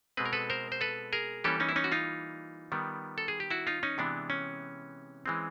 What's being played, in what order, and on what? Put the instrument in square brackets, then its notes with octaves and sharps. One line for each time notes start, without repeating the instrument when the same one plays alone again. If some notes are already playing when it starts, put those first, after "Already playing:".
[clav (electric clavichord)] B2 G#3 C4 B4
A#4
A4 B4
A#4 C5
C5
A4 B4
G#4 A#4
E3 G3 A#3 C#4 G4 A4
C#4 D#4
E4
C#4 D#4
F#4
D#4 F4
D#3 G3 B3
A4
G#4
G4
E4 F#4
D#4 F4
C#4 D#4
C3 E3 G#3 B3 D4
C#4
E3 G#3 C4